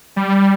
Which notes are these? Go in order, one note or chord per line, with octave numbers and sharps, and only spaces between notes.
G3